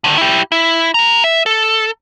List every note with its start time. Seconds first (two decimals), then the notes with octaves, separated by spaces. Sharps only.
0.04 D3 D#3
0.18 E4 G4
0.52 E4
0.94 G#4 A#5
1.24 E5
1.46 A4